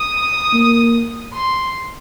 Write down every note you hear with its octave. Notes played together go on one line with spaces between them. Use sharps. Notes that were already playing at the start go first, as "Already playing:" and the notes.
Already playing: D#6
A#3
C6